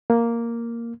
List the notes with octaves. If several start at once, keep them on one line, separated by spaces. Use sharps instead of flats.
A#3